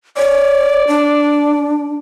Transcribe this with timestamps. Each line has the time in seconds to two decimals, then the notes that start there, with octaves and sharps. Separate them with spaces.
0.17 C#5 D5
0.88 D4